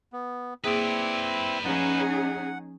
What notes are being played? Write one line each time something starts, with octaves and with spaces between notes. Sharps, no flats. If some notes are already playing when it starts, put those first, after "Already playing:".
B3
A#3 C4 E4 G#4 B4 D5 D#6
F3 C#4 D#4 G#4 F#5